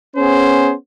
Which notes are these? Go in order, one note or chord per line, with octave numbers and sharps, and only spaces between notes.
B3 C#4 G#4 C5